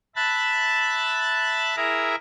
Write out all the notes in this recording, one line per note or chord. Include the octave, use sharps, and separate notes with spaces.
E5 A5 B5 F#6 A6
E4 G#4 A#4 E5 A#5